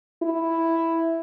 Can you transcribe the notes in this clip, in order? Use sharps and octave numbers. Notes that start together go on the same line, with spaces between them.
E4